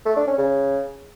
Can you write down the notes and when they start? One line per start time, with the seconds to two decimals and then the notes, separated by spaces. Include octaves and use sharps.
0.05 A3
0.16 D4
0.27 C#4
0.38 C#3